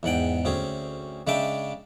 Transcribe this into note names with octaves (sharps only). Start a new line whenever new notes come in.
E2 G#2 F#5 G5
D2 C4 C#4 G#4
C#3 G#3 D4 E5 G5 A5